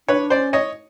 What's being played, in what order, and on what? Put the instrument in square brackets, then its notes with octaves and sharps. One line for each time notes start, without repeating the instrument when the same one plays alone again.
[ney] D4 [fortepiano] B4 C#5
[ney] C#4 [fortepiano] C5 D5
[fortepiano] C#5 D#5